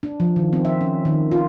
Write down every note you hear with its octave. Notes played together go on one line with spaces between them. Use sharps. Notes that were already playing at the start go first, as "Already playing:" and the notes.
D4
F3
D#3
C4
E5
C#4
D#3
F4